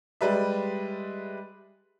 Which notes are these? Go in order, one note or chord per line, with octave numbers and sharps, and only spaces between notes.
G3 G#3 B4 D5 E5